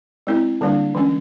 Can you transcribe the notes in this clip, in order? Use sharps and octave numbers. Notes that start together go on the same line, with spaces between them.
G#3 C4 E4
D3 G3 A#3 D4
E3 G#3 C#4